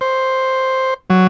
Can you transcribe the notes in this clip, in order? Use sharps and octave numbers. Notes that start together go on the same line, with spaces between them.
C5
F#3